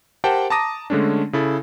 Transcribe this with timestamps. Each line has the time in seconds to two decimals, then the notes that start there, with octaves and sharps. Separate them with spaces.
0.24 G4 A#4 C5 F#5 G5 A5
0.50 A5 A#5 D6 D#6 A#6 D#7
0.90 D3 G#3 A3 C#4 D4
1.33 C#3 E4 A4